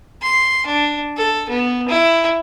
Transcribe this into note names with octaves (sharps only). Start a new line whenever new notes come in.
C6
D4
A4
B3
E4